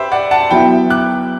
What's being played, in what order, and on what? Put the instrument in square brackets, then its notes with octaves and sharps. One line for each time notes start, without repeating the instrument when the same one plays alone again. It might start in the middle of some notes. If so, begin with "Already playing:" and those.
Already playing: [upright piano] G4 B4 C5 E5
D5 F#5
F#5 A5
[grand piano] F#3 B3 E4 [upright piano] G5 B5
[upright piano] D6 F#6